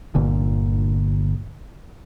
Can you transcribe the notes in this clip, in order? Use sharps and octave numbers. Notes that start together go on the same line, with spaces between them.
G1 A#2 D3